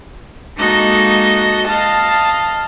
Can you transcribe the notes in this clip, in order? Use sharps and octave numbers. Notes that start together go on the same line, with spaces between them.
G#3 A#3 D#4 F#4 A4 D#5
D#5 F5 A5